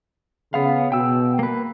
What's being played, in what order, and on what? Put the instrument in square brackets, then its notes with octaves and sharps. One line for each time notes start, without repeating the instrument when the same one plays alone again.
[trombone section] C#3 [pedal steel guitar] B3 F5
[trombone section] B2 [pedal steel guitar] G5 E6
[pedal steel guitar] A#3 B4